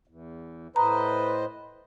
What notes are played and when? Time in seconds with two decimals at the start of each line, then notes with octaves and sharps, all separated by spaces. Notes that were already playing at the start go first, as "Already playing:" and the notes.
0.07 E2
0.76 A2 B4 C5 D#5 A#5